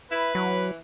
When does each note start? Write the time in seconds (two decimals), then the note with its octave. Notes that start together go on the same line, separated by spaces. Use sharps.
0.11 E4 B4
0.35 E3 F#3